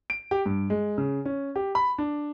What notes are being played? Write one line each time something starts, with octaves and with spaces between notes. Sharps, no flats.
D7
G4
G2
G#3
C#3
C#4
G4
B5
D4